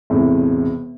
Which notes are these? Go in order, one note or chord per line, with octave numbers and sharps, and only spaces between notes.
E1 A2 C3